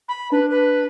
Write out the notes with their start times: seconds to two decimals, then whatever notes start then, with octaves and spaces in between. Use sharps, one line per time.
0.08 B5
0.32 D4 B4
0.51 B4